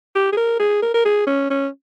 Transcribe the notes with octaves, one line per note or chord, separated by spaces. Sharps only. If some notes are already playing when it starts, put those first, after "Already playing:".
G4
G#4
A#4
G#4
A#4
A#4
G#4
C#4
C#4